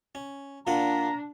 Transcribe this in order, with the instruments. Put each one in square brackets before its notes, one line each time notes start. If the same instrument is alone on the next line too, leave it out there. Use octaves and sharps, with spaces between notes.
[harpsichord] C#4
[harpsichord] A#2 F4 F#5 [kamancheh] D4 [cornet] A#5